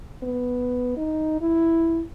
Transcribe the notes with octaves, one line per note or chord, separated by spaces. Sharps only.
B3
D#4
E4